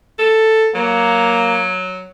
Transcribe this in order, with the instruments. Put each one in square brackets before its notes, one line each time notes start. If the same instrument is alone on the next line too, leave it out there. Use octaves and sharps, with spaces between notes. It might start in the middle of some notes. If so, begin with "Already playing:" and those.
[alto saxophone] A4
[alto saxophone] F#3 [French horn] A#3